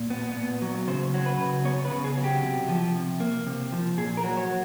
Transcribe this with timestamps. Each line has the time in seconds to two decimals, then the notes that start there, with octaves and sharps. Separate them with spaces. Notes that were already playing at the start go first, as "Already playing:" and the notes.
Already playing: A#2
0.10 B3
0.36 A#2
0.62 F#3
0.88 C#3 C5
1.14 F#3
1.26 B4
1.39 C#3
1.65 B3 C#5
1.85 B4
1.92 C#3
2.04 G#4
2.17 F#3
2.24 G4
2.43 C3
2.69 F3
2.95 C3
3.20 A#3
3.47 C3
3.72 F3
3.98 A#2 G#4
4.17 A#4
4.24 F#3
4.37 C#5